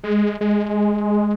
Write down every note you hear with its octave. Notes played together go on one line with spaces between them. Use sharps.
G#3
G#3